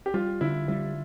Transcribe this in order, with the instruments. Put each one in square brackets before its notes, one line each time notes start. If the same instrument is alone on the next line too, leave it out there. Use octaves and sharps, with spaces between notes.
[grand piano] G4
[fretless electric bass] G3 [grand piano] F4
[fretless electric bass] D3 [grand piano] E4
[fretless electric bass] G3 [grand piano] E4